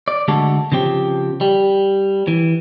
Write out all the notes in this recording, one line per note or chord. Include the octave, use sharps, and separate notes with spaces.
D5
D3 G#3 A3 F#4 A4
C#3 F3 C4 G4
G3
E3